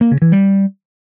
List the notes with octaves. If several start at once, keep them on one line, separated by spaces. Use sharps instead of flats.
A#3
C#3
E3
G3